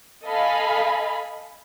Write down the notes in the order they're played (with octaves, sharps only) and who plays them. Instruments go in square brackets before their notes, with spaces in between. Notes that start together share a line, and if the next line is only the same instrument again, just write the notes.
[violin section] A4 D#5 F5 G#5 B5